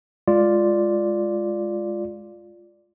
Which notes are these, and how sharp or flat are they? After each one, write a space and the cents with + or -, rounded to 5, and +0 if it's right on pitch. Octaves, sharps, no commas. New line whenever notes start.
G#3 +0 F4 +0 D5 +0